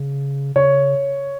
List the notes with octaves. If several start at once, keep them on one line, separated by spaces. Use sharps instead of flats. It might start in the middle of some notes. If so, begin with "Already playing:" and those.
Already playing: C#3
C#3 C#5